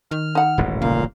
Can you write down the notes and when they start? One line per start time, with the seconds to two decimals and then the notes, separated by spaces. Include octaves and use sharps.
0.11 D#3 F6
0.35 D#4 F#5
0.58 D#1 A1 G#2
0.82 A#2 C#3 A#3 F5